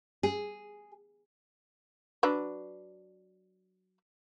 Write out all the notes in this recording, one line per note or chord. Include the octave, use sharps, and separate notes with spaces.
G#4
F#3 D4 B4